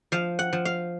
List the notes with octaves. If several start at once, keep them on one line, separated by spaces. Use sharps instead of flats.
F3 F5
F#5
F3
F5